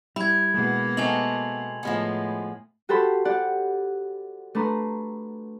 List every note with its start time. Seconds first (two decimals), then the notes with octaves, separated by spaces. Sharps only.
0.16 G3 E4 B5 G#6
0.54 B2 G#3 A#3 B3
0.97 A3 C4 D#4 G#5 F7 F#7
1.83 A2 F3 G#3 B3
2.89 F#4 G4 A4 C5 B5
3.25 G4 D5 F#5
4.55 A3 D4 B4 A#5 C6